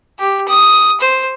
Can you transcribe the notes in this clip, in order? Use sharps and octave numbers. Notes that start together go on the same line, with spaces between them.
G4
D#6
C5